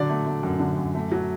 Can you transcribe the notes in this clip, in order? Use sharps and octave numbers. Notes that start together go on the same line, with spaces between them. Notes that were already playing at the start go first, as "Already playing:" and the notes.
Already playing: D3 F#3 D5
A3
A3
F#2
D3
F#2
A3
F#3